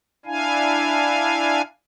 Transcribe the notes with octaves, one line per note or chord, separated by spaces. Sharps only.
D4 E4 F5 G#5